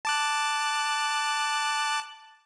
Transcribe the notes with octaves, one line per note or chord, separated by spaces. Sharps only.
A5 D6 F#6